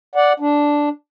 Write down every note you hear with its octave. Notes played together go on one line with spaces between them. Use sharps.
D5 F#5
D4